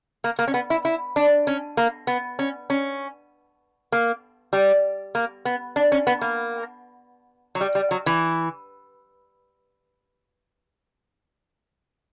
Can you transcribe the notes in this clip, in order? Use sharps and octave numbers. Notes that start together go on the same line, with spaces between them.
A#3
A#3
C#4
B3
E4
E4
D4
C#4
A#3
B3
C#4
C#4
A#3
G3
A#3
B3
D4
C#4
B3
A#3
F#3
G3
G3
F#3
E3